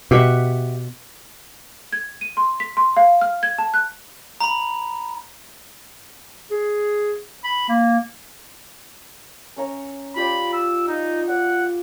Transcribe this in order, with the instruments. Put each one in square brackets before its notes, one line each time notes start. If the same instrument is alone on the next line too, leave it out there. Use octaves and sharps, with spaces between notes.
[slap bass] B2 [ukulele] G4 E5 F#5
[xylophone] G#6
D#7
C6
B6
C6
F5
F6
G#6
A5
F#6
[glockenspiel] A#5 B5
[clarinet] G#4
B5
A#3
[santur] C#4 C#5 A#5
[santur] F4 G4 D5 [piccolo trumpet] B5
[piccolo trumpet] E6
[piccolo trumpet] D#4 [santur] F4
[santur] D5 [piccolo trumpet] F#5